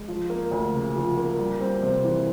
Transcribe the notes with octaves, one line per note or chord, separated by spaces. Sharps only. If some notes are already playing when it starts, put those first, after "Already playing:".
Already playing: G#3
F3
A#3
D2
C#3
F3
A#3
G3
C4
C3
E3